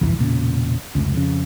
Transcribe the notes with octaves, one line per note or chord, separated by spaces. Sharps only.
G1 C2 F2 E3
E1 A#2 C#3
F1 C#2
F2 C#3